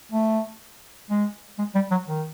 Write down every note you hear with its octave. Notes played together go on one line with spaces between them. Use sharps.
A3
G#3
G#3
G3
F#3
D#3